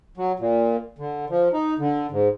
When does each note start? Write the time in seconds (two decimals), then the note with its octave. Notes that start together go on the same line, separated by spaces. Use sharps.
0.17 F#3
0.40 A#2
0.98 D3
1.30 F3
1.53 D#4
1.79 D3
2.11 G#2